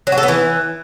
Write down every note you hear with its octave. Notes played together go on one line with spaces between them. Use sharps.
F#3
F#4
A4
B3
E3